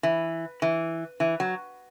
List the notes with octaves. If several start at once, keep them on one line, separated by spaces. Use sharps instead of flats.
E3
E3
E3
F#3